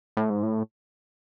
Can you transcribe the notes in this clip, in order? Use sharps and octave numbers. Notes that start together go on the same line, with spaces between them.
A2
G#2
A2